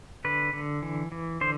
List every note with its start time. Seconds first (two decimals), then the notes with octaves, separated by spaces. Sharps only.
0.25 D3 B4
0.53 D3
0.82 E3
1.12 E3
1.41 D3 C5